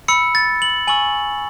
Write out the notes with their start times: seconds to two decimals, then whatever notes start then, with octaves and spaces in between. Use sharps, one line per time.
0.08 B5 E6 C#7
0.35 A6
0.62 F#7
0.87 G#5 C#6 E6 F#7